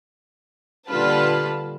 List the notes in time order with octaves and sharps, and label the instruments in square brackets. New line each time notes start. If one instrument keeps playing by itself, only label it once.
[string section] A#2 D3 G3 F4 B4 A5